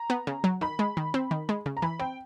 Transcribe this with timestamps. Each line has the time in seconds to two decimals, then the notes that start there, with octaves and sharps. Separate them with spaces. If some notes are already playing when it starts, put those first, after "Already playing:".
Already playing: A#5
0.10 B3
0.27 C#3
0.44 F#3
0.61 D#3 B5
0.79 G#3
0.97 D#3
1.14 C4
1.31 D#3
1.49 G#3
1.66 C#3
1.77 A#5
1.82 E3 B5
2.00 C4 G5